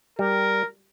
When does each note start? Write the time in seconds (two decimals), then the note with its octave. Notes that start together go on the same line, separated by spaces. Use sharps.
0.19 G3 A#4